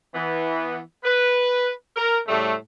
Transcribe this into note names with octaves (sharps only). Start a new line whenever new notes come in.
E3 B3
B4
A#4
A2 C#3 G3 A3